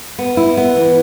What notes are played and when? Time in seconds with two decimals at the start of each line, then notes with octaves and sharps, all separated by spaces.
0.18 B3
0.37 E4
0.57 B3
0.76 E3